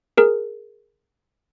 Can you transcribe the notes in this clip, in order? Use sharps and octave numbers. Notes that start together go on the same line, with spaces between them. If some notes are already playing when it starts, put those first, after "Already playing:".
G#4 A#4